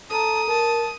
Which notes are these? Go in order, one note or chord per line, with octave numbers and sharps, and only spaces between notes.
A4 A5 A#5 D#6
A#4 A5